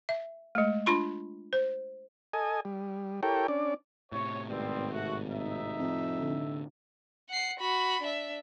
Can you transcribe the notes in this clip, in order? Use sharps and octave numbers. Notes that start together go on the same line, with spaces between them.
E5
G#3 A3
D4 F4 B5 C6
C5
A4 D#5 G#5
G3
E4 G4 A4 A#4 C#5 G5
C#4 D4 D5
A2 C3 C#5
G#1 G3 B3 C4
A3 F#4
D#4 E5
F2
D3
F#5 C7
F#4 B5
D4 E5